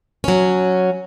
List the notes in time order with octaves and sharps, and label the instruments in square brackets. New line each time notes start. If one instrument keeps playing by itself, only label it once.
[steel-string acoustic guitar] F#3 C#4